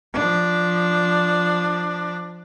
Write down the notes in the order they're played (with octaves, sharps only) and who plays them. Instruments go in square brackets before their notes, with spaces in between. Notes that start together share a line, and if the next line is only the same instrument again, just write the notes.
[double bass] F3 D4